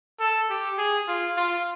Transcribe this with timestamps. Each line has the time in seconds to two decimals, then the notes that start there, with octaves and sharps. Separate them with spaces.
0.20 A4
0.49 G4
0.78 G#4
1.08 F4
1.37 F4